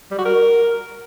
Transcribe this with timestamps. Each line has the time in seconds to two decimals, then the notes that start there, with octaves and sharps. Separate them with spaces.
0.11 G3
0.18 F#4
0.25 A#4